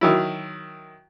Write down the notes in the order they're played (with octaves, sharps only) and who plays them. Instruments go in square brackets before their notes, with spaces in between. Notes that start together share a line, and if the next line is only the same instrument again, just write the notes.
[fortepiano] D#3 F#3 E4